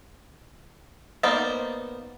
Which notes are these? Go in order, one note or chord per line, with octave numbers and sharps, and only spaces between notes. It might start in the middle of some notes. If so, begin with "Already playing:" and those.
A#3 B3 D#4 C5 D5